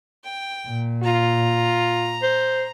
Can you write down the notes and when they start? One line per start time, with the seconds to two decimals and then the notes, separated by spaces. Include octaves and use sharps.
0.24 G5
0.68 A#2
1.03 F4 A#5
2.23 C5